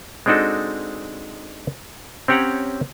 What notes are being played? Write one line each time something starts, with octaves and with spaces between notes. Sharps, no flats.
G#3 C4 D4 D#4 F#4 A4
C4 C#4 G4 C#5 F#5 A#5